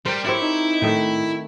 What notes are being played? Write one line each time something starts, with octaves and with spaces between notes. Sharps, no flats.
G3 A#4 C5
C4 E4 G4 C#5
D#4
A2 D#3 A3 D#4